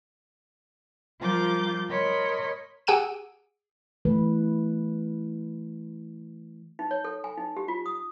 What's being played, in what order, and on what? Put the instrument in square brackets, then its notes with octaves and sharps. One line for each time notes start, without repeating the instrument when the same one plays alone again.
[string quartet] F3 G3 F4 A#4 D6 G6
A#4 C#5 D#5 B5 C6
[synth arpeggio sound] G4 G#4 F#5 E6 D7 D#7
[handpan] E3 A3 B4
[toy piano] D#4
C#5
A4
G#5
D#4
G4
F4
D#6